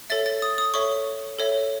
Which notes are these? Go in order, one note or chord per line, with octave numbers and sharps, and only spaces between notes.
A4 C#5 E5 A6
A6
D#6
D#6
A4 C#5 E5 C#6
A4 C#5 E5